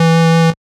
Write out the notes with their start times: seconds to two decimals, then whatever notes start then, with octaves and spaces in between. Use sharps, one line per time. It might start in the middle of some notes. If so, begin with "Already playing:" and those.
Already playing: E3